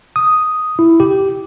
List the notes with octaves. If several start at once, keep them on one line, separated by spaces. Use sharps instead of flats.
D#6
E4
G4